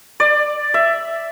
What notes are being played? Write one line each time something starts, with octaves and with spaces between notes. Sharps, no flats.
D5
E5